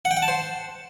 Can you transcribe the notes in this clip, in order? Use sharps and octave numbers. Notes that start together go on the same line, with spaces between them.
F#5
G5
F#5
A5
C5